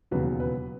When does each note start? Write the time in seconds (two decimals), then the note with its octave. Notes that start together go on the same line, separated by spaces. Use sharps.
0.11 E1 D#2 C#3 F#3 B3 B4
0.40 B4